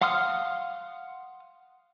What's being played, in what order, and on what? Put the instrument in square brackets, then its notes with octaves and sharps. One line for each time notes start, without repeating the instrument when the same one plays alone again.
[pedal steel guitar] F5 F#5 C6 D#6 F6